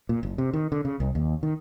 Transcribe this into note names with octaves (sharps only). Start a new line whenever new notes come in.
A#2
F#1
C3
D#3
D3
C#3
C2
D#2
D#3